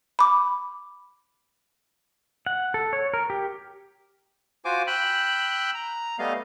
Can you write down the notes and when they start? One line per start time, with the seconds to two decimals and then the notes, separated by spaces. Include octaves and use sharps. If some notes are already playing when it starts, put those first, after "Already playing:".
0.19 B5 D6
2.46 F#5
2.74 A4
2.93 C#5
3.14 A#4
3.30 G4
4.65 F4 F#4 C5 G#5 D6
4.87 G5 B5 E6 F#6 G6
5.74 A#5
6.19 G3 A3 B3 D#5 F5